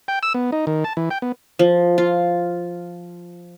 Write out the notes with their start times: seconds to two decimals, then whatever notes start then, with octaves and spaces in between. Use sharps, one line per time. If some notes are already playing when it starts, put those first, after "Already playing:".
0.08 G5
0.23 E6
0.34 B3
0.52 D#4
0.67 D#3
0.84 A5
0.97 E3
1.11 G5
1.22 B3
1.59 F3
1.98 F4